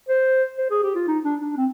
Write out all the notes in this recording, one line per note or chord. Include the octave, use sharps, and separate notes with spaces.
C5
C5
G#4
G4
F4
D#4
D4
D4
C4